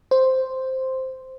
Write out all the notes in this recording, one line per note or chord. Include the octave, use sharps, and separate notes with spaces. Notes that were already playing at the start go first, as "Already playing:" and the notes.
C5